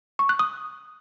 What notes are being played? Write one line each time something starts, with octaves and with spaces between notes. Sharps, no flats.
C#6
F#6
D#6